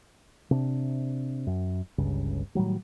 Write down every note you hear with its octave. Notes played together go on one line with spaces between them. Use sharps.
C3 D4
F#2
G1 C#2 G2 C#3
A2 D#3 F#3 G3